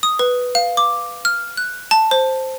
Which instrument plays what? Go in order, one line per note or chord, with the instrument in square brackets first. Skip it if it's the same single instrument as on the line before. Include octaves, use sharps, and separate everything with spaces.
[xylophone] D#6
B4
F5
D6
F6
F#6
A5
C5